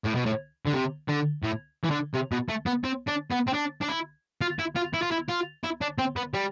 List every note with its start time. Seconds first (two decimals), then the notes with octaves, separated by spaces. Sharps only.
0.04 A2
0.15 B2
0.26 A2
0.67 D3
0.74 C3
1.09 D3
1.44 A2
1.84 E3
1.91 D3
2.14 C3
2.32 B2
2.49 A3
2.66 B3
2.84 C4
3.07 D4
3.31 B3
3.47 C4
3.54 D4
3.81 D4
3.88 E4
4.41 F4
4.59 E4
4.76 F4
4.94 E4
5.02 F4
5.11 E4
5.29 F4
5.64 E4
5.81 D4
5.98 C4
6.16 B3
6.34 G3